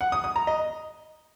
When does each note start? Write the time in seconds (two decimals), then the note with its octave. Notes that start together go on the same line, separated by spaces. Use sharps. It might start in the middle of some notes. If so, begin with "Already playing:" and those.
0.01 F#5
0.12 D#6
0.24 D#6
0.36 A#5
0.47 D#5